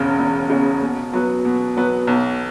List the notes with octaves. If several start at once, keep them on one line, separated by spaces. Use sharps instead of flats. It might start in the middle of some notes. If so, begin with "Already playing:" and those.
Already playing: E1 E2 C#3
E1
E2 C#3
B2
F#3 B3
B2
F#3 B3
B1